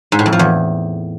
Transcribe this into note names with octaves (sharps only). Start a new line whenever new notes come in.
G#2
A2
F2
F3
E2